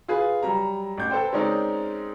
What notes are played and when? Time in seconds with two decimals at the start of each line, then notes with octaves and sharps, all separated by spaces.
0.08 F4 G#4 B4
0.43 F#3 G3 A#5
0.98 A1 G6
1.10 A4 B4 C5 G5
1.33 G#3 C4 C#4 D#4 A#4 D5